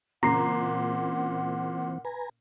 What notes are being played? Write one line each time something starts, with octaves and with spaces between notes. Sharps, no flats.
A#2 C#3 E3 C4 F#5 A#5 C7
B4 G#5 A#5